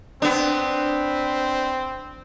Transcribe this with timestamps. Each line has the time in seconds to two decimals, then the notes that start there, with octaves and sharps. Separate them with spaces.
0.22 B3 C4 D4